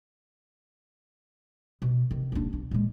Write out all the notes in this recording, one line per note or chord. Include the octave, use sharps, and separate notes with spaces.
B2
C3 D#3
D#1 D4
B1
A#2 G#3